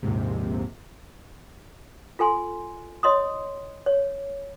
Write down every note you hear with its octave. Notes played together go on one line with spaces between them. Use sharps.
A#1 D#2 G#2 C3
F4 A4 G#5 C6
C#5 D#5 C6 D#6
C#5